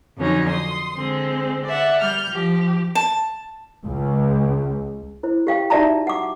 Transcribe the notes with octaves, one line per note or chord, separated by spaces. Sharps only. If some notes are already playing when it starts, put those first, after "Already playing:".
F2 D3 F#3 C#4 D#4
C6 D#6
D3 G#3 C4
D5 E5 F#5
G3 F6 G6
F3 G4
A5
C#2
E4 C5
G4 F5 G5
D#4 F#4 D5 E5 A5 A#5
F#5 D6